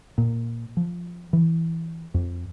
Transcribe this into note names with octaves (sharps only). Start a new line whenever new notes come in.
A#2
F3
E3
F2